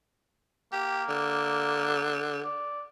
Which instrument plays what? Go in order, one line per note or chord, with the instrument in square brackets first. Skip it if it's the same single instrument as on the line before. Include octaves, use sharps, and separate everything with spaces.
[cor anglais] A#3 [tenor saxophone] G4
[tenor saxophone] D3
[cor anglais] D5